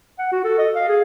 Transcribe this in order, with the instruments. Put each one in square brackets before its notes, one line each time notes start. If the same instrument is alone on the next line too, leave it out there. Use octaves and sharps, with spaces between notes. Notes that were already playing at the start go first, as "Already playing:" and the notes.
[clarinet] F#5
F#4
A4
D#5
F5
G#4